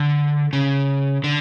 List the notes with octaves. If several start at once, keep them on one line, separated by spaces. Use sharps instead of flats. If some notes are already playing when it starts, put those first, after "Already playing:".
Already playing: D3
C#3
D3